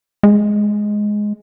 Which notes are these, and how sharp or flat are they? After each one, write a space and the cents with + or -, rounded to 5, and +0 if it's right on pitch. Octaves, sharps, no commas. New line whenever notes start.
G#3 +5